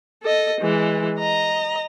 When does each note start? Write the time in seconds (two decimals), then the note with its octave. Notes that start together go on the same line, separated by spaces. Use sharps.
0.23 A4 D#5
0.61 E3 G#3
1.19 D#5 A#5